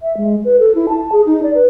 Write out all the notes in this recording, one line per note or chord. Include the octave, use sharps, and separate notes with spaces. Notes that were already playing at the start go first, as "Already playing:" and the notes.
E5
G#3
B4
A4
E4
A5
G#4
D#4
D5
B4